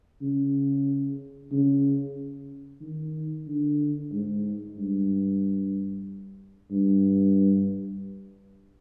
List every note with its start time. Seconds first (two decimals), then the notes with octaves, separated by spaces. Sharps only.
0.22 C#3
1.51 C#3
2.81 D#3
3.47 D3
4.12 G#2
4.76 G2
6.71 G2